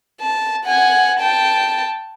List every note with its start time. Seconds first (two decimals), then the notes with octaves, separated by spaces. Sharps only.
0.21 A5
0.65 F#5 G#5
1.20 G5 A5